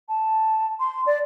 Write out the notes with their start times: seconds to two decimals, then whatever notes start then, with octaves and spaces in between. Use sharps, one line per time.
0.09 A5
0.80 C6
1.06 D5